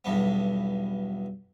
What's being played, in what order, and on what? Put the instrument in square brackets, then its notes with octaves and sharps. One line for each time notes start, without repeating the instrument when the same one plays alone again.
[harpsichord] B1 E2 G2 B3